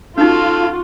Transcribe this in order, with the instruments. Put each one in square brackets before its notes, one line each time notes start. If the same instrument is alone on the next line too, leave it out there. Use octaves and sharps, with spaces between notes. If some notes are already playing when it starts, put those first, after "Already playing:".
[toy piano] C#4 D#4 [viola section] F4 F#4 [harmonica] A4 F5